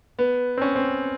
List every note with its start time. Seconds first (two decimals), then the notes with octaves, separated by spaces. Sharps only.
0.19 B3
0.57 C4
0.62 C#4
0.76 C4